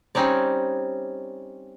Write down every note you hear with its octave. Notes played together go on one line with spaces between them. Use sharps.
G3 C4 C#4 D#4 C#5 D5